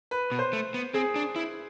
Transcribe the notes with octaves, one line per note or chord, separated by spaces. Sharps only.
B4
B2
C5
A3
B3
C4 G#4
D4
E4